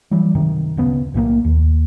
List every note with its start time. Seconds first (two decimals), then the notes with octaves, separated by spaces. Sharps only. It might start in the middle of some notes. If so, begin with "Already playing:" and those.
0.11 E3 F#3 G3
0.35 F#2 C3 D#3
0.77 D1 C#3 B3
1.14 B1 A2 G3 A#3
1.44 D#2